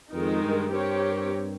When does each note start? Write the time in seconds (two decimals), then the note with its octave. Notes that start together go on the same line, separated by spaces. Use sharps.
0.13 F2 D#3 G#3 D#4 A#4
0.43 G2
0.73 C4 G4 A#4 C#5